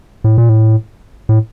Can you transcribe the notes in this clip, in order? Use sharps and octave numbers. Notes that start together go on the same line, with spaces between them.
A2
A#2
A2
A2